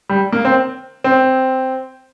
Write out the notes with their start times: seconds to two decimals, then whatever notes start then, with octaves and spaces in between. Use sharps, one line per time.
0.09 G3
0.33 A#3
0.45 C4
1.04 C4